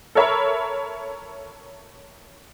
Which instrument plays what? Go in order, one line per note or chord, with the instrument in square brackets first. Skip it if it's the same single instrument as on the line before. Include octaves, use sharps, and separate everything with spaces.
[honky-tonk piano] A4 A#4 C#5 E5 A#5 B5